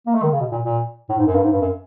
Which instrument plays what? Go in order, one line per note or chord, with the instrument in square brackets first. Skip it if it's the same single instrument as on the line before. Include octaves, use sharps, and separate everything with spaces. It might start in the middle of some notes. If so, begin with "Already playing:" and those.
[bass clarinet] A#3
A3
D#3
C#3
B2
A#2
A#2
A2
G#2
F#2
G2
G#2
G2
F#2